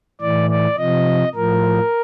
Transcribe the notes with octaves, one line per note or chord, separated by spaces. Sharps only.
A2 E3 D5
D5
C3 F3 D#5
A2 F3 A#4